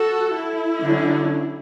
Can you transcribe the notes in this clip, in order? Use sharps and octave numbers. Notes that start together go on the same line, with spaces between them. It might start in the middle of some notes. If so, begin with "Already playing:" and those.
Already playing: F#4 A4
E4
D3 F#3 C#4